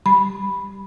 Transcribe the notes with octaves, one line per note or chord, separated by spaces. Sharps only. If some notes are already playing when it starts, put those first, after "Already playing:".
G3 B5